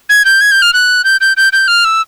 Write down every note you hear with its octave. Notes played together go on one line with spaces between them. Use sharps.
G#6
G6
G#6
G6
F6
F#6
G6
G6
G6
G6
F6
E6